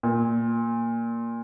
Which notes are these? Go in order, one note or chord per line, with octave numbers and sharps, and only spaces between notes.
A#2